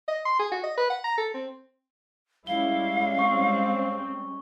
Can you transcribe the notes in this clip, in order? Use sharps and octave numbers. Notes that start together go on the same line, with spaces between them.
D#5
C6
G#4
F#4
D#5
B4
F#5
A#5
A4
C4
G3 G#3 C#4 E4 F5 G7
C4 C#6